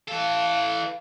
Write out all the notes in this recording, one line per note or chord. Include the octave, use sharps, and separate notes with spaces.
E3 A4 F5